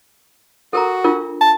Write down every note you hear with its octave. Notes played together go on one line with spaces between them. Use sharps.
F#4 A4 A#4 A#5
D4 F4 A#4
A5